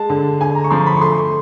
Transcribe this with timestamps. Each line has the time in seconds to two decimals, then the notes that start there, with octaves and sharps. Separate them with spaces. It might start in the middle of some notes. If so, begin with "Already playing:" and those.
Already playing: G#3 A5
0.09 D3
0.41 D3 G#5
0.55 A#5
0.64 C#6
0.71 F3 C6
0.86 B5
0.97 C#6
1.01 A3 C6